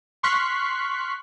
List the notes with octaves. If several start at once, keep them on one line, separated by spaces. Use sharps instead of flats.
C6 C#6 F6 F#6 B6 C7